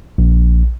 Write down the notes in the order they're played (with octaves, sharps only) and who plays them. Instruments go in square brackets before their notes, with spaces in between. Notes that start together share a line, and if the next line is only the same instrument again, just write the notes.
[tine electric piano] A#1